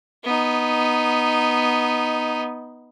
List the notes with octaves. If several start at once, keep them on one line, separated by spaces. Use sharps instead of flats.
B3 D#4